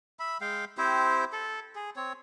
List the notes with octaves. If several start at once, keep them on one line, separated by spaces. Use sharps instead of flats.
E5 B5
G#3 F5 G5
C4 E4 G4 C5
A4
G#4
C4 C#5